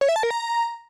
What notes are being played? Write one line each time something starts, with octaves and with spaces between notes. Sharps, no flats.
C#5
E5
A5
A#4
A#5